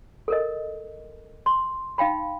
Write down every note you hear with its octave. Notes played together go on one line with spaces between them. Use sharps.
A4 A#4 D#5
C6
D#4 F5 G5 B5